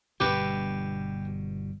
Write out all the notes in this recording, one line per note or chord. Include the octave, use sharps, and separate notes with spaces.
G1 G2 B2 G4 B4